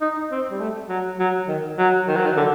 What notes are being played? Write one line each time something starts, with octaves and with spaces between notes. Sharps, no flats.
D#4
C4
G3
A3
F#3
F#3
D#3
F#3
D#3
F#3
D#3
D3